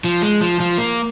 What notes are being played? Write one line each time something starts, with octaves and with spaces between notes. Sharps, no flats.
F3
G#3
F3
F3
A#3